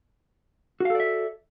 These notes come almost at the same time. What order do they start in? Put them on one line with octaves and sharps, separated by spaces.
F#4 F5 A4 D5 E5